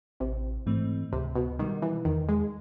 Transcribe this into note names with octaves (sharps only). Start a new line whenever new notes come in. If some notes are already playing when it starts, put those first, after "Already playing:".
A1 C3
G#2 E3 A3 C4
C#2 C3
B2
B2 D#3 G3
E3
E2 D#3
G#3